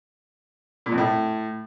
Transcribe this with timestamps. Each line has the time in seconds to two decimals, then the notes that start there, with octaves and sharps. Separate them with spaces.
0.86 A#2
0.92 F2
0.98 A2